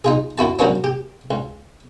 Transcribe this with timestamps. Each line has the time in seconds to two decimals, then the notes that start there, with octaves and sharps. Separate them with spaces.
0.04 D#4 F4 G#4
0.38 F#2 E4 F#4 A5
0.59 F3 F#3 A#3 B3 C#4 D4
0.84 G4
1.31 C#2